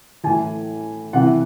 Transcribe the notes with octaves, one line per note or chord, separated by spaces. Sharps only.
A2 E3 G#5
C3 E3 F#5